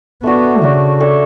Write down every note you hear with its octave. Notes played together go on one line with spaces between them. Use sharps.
A3 B3 D4 F#4
C#3 A3 D4 F#4
D4 A4 C#5 E5